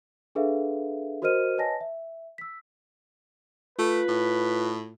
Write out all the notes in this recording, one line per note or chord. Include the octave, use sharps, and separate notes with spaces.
D4 G#4 A4 B4 E5 F5
F#4 A#4 C5 D#5 F6 D#7
B4 C#5 D#5 G#5 A5 A#6
E5
E6 B6
A3 F4 B4
A2